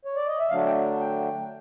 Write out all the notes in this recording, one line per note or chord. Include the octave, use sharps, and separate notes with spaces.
C#5
D5
D#5
E5
D3 F#3 A3 D4 F5
G5
G5